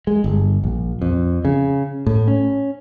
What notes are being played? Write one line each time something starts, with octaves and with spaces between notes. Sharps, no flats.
G#3
G1
A#1
F2
C#3
A2
C#4